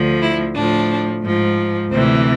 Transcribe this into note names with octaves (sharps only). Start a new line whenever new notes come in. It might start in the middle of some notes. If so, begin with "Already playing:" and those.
Already playing: D2 D3 F3
E4
A2 F3 D4
G#2 F3
D2 C3 E3 C4